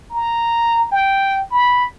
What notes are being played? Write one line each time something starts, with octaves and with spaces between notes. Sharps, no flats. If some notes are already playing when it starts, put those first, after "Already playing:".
A#5
G5
B5